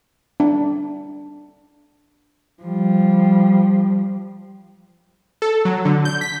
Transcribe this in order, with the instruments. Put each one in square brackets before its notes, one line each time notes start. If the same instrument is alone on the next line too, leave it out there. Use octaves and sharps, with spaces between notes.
[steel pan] D4
[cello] F3 G3
[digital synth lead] A4
F#3
D3
G6
B6